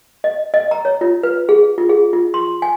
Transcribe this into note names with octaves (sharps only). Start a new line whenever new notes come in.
D#5
D#5
A#5
C#5
F4
B4
G#4
F4
G#4
F4
C6
G#5